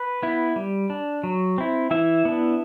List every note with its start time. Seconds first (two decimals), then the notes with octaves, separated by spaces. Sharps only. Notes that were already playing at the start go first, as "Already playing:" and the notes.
Already playing: B4
0.22 B3 E4
0.56 G3
0.90 D4
1.23 F#3
1.58 C4 E4
1.91 E3 E4 E5
2.25 B3 D4